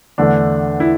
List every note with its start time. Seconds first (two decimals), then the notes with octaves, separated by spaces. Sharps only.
0.18 E2 D3 A3 D4
0.80 E4